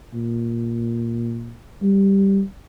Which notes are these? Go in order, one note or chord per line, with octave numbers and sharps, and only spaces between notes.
A#2
G3